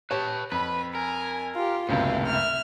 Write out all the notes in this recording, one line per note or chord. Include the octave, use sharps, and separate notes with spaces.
G4 B4 C#5 A5
F2 B4 B5
A#4 G#5
F4 G4
G1 C#2 F#2 A2 C3 F5
E5 F6